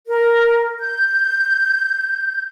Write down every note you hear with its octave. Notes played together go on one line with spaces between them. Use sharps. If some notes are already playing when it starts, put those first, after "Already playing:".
A#4
G6